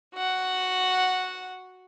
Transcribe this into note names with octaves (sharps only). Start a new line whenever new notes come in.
F#4 F#5